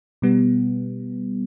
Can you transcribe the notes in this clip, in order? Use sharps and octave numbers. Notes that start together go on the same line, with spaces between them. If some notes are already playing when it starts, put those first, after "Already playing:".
B2 G3 B3